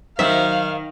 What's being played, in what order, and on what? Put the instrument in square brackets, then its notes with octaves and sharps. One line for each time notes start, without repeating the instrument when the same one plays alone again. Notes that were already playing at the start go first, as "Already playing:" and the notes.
[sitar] D#3 [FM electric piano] F#3 C5 [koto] E5 [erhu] F5